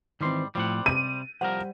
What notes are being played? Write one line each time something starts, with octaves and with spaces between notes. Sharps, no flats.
G#2 D#3 E3 G3 C4 C6
A2 F3 G3 C4 F#5
C3 D#7
C2 F3 G3 A#4 C5 F#5